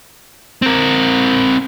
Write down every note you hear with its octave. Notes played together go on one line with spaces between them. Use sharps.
C4 A#4